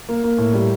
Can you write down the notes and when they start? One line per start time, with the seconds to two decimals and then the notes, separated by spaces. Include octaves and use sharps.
0.09 A#3
0.24 A#3
0.38 A2
0.54 G3